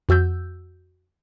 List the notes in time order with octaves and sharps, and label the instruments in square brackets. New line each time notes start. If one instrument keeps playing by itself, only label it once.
[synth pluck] F2 F#4 E6 G6